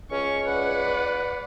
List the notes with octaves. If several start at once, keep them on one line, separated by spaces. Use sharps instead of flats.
C#2 C#4 C#6
B4 D5 F#5